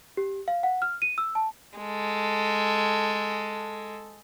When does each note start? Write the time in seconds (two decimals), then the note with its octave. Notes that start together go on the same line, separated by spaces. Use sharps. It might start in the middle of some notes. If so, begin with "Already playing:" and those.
0.17 G4
0.48 F5
0.63 F#5
0.82 F6
1.02 D#7
1.18 E6
1.35 A5
1.79 G#3 A4